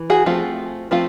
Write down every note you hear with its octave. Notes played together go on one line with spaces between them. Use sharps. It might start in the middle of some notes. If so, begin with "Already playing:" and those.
Already playing: E3
F#4 G#4
F3 A3 C4 F4
F3 A3 C4 F4